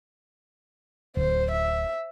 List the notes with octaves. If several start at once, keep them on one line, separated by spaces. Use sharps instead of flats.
D1 C5
E5